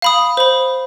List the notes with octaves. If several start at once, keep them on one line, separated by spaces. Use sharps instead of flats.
F5 B5 D#6
C5 B5